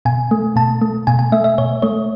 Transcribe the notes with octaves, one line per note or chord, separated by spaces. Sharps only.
B2 G#5
A3
B2 A5
A3
B2 G#5
G#5
A3 E5
E5
B2 C#5
A3 C#5